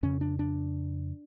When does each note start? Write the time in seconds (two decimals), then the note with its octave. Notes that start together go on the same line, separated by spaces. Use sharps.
0.03 F2 C#3 C#4
0.21 D4
0.39 D4